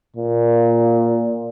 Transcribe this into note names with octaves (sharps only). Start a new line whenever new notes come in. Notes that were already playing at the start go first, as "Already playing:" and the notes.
A#2